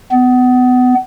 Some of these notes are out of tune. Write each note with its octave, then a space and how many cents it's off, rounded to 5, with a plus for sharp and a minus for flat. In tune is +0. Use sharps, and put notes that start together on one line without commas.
B3 +25